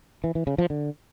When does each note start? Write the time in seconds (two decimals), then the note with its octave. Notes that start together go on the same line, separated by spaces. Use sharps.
0.24 E3
0.35 E3
0.47 C#3
0.58 F3
0.70 D3